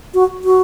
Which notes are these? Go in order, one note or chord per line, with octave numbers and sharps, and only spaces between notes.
F#4
F#4